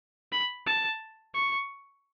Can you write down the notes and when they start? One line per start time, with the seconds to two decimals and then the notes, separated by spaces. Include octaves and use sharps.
0.32 B5
0.66 A5
1.34 C#6